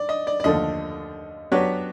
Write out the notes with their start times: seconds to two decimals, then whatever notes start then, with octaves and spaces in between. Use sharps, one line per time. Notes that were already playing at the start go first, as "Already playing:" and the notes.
Already playing: D5
0.09 D#5
0.27 D5
0.40 D5
0.44 D#2 D3 F3 A3 D#5
1.52 F#3 B3 D4 G4 B4 C#5